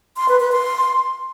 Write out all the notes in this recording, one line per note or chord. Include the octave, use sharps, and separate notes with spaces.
C6
B4
B4
C6